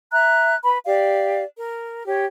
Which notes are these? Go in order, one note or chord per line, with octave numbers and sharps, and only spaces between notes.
E5 A#5 F#6
B4 B5
G4 D5 F5
A#4
G4 C#5